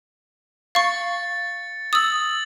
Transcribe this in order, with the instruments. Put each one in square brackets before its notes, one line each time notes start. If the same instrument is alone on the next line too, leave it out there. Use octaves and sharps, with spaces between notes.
[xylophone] F5 C#6 [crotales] A6 C#7
[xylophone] D#6 E6 [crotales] A6 F#7